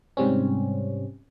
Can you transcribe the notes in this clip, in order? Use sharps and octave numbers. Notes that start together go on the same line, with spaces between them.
G#2 C3 G3 C4 C#4